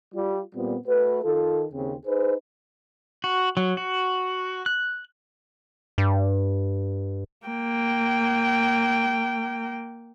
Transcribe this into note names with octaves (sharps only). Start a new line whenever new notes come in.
G3 F4
A#2 G3 B3 C4 F4
A3 F#4 B4
D#3 F4 A4
D#2 C#3 C4
D#4 G#4 B4 C5
F#4
F#3
F#4
F#6
G2
A#3 G5